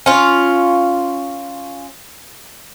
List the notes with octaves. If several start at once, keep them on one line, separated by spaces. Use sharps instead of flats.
C#4 F4